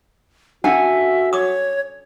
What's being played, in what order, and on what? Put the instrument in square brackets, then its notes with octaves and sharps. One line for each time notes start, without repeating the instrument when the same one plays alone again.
[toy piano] C#4 D4 F#5 [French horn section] F#4 [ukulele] A4 G#5 [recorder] E5
[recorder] C#5 [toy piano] D6 D#6